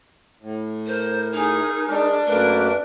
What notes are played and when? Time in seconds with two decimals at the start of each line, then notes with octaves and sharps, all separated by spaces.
0.41 A2
0.87 A#4 C5
1.33 D#4 G#4
1.89 G#3 D4
2.27 F#2 A3 A#3 A#4 B4